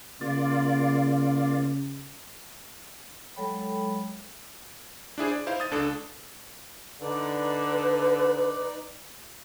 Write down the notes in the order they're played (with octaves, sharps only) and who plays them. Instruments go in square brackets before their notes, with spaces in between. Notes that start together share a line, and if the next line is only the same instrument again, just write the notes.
[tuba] C#3 [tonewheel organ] A#3 F4 D5
[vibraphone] F#3 G#3 A4 C#5 G5 B5
[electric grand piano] D4 E4 G#4 C5
D5
D#4 E4 C5 F5
D#6 A6
C#2 D4 A4
[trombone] D3 [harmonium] D#4 D5 [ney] B4